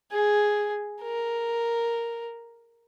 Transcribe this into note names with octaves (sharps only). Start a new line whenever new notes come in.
G#4
A#4